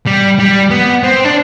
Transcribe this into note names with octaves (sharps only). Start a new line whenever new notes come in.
G3
G3
B3
C4
D4